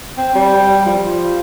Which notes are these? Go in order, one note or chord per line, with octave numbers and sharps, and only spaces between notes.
C4
G3
F3